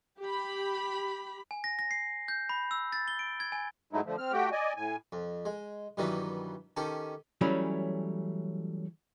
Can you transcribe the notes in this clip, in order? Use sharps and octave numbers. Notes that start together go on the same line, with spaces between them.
G4 B5
G#5
A#6
A#6
C7
G6
B5
E6
A6
G7
D7
G#6
G#5
G#2 F#3 G#3 A3 D#4 E4
D3 F3 A3
C4 F6
A3 F#4 G4 G5
D5 D#5 G#5
A2 G#5
F2
G#3
G2 D#3 E3 F#3 G3 B3
D#3 C#4 G4 A4
E3 F#3 G3 A3 C#4